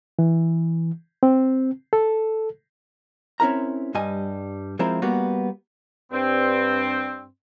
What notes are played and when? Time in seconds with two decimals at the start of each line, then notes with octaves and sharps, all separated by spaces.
0.19 E3
1.23 C4
1.93 A4
3.40 C4 C#4 E4 A#4 A#5
3.95 G2 G3 D#5 G#5
4.79 F3 G#3 C4 E4 A#4
5.02 G3 A#3 B3 F#4
6.12 G2 C4